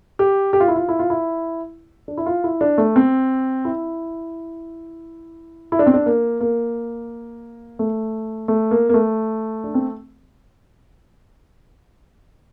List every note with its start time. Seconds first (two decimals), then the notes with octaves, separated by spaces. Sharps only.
0.19 G4
0.53 G4
0.60 F4
0.68 E4
0.76 F4
0.89 E4
0.99 F4
1.10 E4
2.08 D4
2.17 E4
2.26 F4
2.44 E4
2.61 D4
2.78 A3
2.96 C4
3.65 E4
5.72 E4
5.79 D4
5.86 C4
5.94 D4
6.06 A#3
6.40 A#3
7.79 A3
8.48 A3
8.71 A#3
8.89 A#3
8.94 A3
9.64 D4
9.74 C4